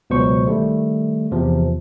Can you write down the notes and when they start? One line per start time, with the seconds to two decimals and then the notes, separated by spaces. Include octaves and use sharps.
0.10 C#2 B2 F#3 C5 C#6
0.47 D#3 G3 A3
1.31 E2 C3 F3